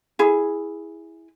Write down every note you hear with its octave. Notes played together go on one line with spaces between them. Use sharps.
E4 G#4